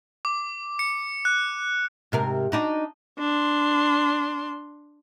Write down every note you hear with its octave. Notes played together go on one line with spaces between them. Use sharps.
D6
C#7
F#6
G#2 C3 A#4
D4 D#4 F#4
D4 C6